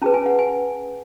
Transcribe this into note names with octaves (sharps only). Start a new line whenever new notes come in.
C#4 G#4 B4 A5
G#5
F#5
G#5